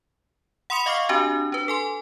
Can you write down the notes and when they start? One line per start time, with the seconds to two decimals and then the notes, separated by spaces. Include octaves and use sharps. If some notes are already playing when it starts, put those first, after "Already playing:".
0.70 F#5 B5 C6 D#6 C#7 F7
0.86 D#5 F5 C#6 D6 F6 C7
1.09 C4 D4 F#4 G4 G#5
1.52 D4 B4
1.68 A4 G#5 C6